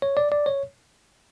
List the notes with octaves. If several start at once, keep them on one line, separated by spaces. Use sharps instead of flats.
C#5
D5
D5
C#5